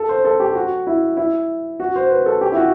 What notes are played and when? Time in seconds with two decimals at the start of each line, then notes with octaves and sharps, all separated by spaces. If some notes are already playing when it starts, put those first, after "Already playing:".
Already playing: A4
0.09 C5
0.25 A4
0.40 G4
0.55 F#4
0.87 E4
1.17 E4
1.80 F#4
1.96 C5
2.10 B4
2.26 A4
2.41 G4
2.52 E4
2.57 F#4